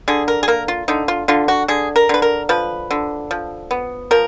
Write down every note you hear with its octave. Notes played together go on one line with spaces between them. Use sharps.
D3 G#4
A#4
G#4
A#3 A#4
F4
D3 D#4
F4
D3 F4
F#4
D3 G#4
A#4
D3 B4
A#4
F3 B4
D3
F3
B3
F3 A#4